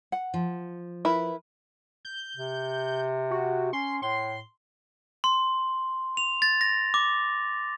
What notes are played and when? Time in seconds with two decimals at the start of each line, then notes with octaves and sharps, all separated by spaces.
0.12 F#5
0.34 F3
1.05 E4 A#4 B4 B5
2.05 G6
2.37 C3
3.31 F#4
3.73 C#4 C6
4.02 A2 C6
5.24 C6
6.17 F7
6.42 A6
6.61 A#6
6.94 D6